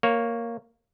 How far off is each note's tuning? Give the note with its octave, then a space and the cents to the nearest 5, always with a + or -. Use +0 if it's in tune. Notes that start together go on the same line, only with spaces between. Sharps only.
A#3 +0 C#5 +0